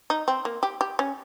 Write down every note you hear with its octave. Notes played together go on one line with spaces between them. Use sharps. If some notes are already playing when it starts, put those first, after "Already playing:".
D#4
C4
A#3
G4
G4
C#4